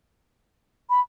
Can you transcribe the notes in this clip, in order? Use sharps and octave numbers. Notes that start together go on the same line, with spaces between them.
B5